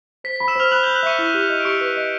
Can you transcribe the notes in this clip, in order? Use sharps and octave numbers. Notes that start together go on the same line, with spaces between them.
C5 B6
B6
B5
E6 E7
C5 F6 F7
B5 F#6 F#7
G6 G7
B5
F#6 F#7
E5 C#6 C#7
E4
G4
D#5
D7
G4 C#6 C#7
B4
D#5